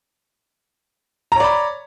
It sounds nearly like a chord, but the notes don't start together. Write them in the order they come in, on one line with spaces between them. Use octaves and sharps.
A#5 C#5 D5 B5